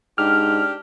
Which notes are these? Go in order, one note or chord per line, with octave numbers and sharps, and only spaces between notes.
G#2 D4 G4 F6